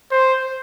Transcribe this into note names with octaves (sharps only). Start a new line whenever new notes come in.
C5